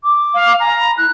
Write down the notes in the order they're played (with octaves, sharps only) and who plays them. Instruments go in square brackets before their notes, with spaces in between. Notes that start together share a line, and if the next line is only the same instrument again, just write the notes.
[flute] D6
[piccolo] F5
[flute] G#5 [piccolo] A#5
[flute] B5
[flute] E4 [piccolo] F#6